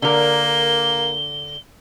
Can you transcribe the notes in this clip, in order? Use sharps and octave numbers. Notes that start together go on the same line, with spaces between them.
D3 A#3 A#4 G7